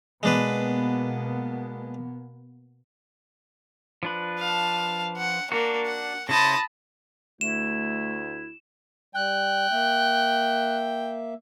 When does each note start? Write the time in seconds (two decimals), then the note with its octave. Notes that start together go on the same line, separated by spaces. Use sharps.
0.23 B2 G#3 A#3 B3 D4 B4
4.03 F3 D4 B4
4.40 F5 A5
5.18 F#5
5.52 A#3 D4 F#4
5.86 F#5
6.29 C#3 E4 C5 A5 B5 D#6 A#6
7.41 D2 A3 E4 E7
9.15 G3 G5 F#6
9.72 A#3 E5